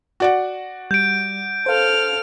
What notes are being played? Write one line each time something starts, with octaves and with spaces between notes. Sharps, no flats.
F#4 D5 F#5
G3 G6 D7
A4 C5 F5 F6